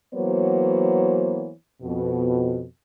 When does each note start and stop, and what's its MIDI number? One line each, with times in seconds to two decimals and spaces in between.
0.14 1.50 52
0.14 1.50 54
0.14 1.50 58
0.14 1.50 59
0.14 1.50 72
0.14 1.50 73
1.82 2.62 41
1.82 2.62 47